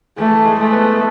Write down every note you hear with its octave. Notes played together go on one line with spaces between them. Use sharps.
E3 A3 E4
G#3 G#4
A3
B3 B4